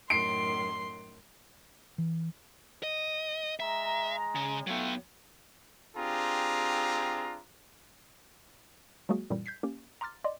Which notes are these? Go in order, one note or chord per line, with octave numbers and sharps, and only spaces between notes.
F#2 A2 D#3 C6 C7 D7
E3
D#5
G#3 E5 A#5
C#3
F#3 A3 B3 F4 G5
C4 D4 F4 G4 G#4 A#5
F#3 G#3 A#3 F#4 G#4
F#2 A#2 E3 G3
G6 G#6 B6 C7
A#3 C#4 G4
A#5 C6 D6 F6 A6
D5 D#5 C6 D6